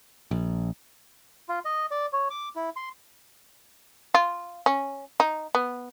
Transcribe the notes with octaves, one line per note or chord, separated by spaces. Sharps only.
A#1
F4
D#5
D5
C#5
D6
E4
C6
F4
C#4
D#4
B3